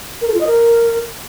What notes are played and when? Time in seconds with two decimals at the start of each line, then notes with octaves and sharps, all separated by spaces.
0.21 A#4
0.28 A4
0.34 F4
0.40 D#5
0.47 A#4